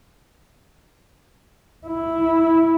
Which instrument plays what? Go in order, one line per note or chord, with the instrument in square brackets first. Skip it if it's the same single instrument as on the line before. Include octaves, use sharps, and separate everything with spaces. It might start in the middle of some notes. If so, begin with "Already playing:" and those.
[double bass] E4